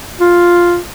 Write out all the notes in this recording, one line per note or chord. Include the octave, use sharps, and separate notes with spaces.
F4